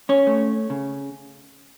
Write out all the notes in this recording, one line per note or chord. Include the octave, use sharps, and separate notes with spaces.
C#4 C#5
A3
C#3